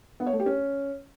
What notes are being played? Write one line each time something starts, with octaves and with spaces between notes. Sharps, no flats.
B3
C#5
A3
G4
C#4